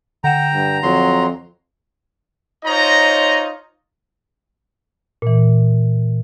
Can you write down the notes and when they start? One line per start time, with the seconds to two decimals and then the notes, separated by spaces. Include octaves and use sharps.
0.24 D3 F#5 G5 A#5 E7
0.54 G2
0.83 F2 F#3 C6
2.64 D#4 F4 C5 C#5 D#5 A#5
5.22 A#2 E3